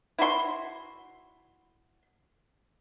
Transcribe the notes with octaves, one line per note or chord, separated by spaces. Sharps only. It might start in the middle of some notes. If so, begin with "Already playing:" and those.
E4 F#4 C6